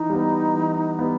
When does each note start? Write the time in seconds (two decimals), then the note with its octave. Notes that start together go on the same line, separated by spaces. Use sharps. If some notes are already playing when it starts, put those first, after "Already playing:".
Already playing: E3 D#4
0.10 G3 B3
0.54 E3
0.99 G3 B3